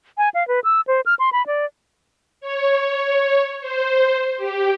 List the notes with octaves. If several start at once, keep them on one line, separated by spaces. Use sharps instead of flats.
G#5
F5
B4
E6
C5
F6
C6
B5
D5
C#5
C5
G4